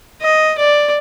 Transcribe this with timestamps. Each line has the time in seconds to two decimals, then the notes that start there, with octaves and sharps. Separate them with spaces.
0.21 D#5
0.58 D5